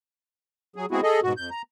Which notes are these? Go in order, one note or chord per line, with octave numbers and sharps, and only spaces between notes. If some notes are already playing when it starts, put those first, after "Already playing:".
F#3 G#4
G#3 B3 C4 E4 F#4 G#4
G#4 A4 D#5
G#2 B2 F#4
F2 G6
A#5